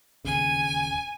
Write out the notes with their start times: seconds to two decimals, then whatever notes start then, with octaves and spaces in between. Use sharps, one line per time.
0.25 D1 D#2 C#3 G#5